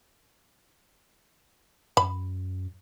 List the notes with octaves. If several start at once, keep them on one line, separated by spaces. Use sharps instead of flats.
F#2 B5